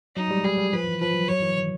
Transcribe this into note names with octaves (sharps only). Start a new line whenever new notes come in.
F#3 D#4
G3
G#3
G3 G#4
G3
F3 B4
E3
F3 B4
F#3
F#3 C#5
E3
D#3